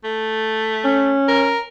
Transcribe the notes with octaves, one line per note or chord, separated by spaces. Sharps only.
A3
C#4
A#4